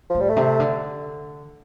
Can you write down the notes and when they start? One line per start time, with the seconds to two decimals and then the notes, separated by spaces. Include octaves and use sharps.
0.10 F3
0.15 A2
0.20 G3
0.30 A3
0.37 C3
0.60 D3